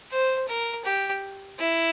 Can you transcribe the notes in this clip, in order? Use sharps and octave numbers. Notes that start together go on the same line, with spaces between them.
C5
A#4
G4
E4